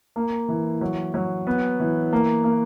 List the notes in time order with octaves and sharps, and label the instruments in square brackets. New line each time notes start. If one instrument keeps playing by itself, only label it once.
[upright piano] A#3
E3
F#3
F#3
B3
E3
A#3
A#3